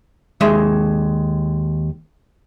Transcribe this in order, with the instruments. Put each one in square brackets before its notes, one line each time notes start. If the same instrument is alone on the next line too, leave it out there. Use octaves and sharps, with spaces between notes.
[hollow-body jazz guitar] D#2 G#3 E5